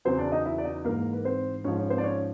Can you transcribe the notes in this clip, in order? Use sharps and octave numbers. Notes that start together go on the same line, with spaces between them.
E2 C#3 F#3 C4 C5
D4 D5
D#4 D#5
E4 E5
D5
D#4 D#5
G#2 E3 A#3 A#4
B4
C4 C5
G#2 F3 C#4 C#5
C#4 C#5
C4 C5
D5
C#4 C#5